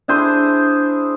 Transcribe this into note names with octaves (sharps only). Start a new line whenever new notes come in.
D4 E4 G#4 C5